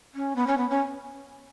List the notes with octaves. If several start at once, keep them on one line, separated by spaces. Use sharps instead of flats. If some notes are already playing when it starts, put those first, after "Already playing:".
C#4
B3
C#4
B3
C#4